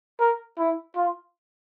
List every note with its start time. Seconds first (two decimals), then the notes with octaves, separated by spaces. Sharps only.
0.20 A#4
0.59 E4
0.96 F4